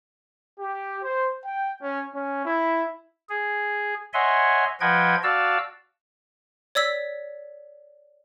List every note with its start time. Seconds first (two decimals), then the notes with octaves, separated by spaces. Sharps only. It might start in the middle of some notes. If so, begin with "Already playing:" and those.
0.60 G4
1.03 C5
1.45 G5
1.83 C#4
2.13 C#4
2.45 E4
3.29 G#4
4.14 C#5 D#5 E5 F#5 G#5 C6
4.80 F3 B4 D#5 F#5 G5 G#6
5.23 F#4 D5 F5 A5 E6
6.75 C#5 D5 E6 B6